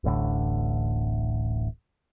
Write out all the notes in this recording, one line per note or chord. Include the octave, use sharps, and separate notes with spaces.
D1 A1 A2 D3